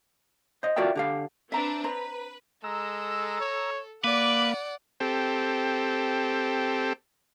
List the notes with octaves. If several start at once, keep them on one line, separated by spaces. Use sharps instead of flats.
C5 D#5
F4 F#4 A#4 D5 E5 G5
D3 G4 F5
C4 D4 B4 E5 A#5
B4 C5 A#5
G#3 A4 A#5 E6
C#5
A#3 B4 D5 F5 F#5 D6
C4 G4 A4